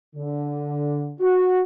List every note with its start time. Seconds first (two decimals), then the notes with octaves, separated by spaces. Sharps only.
0.16 D3
1.20 F#4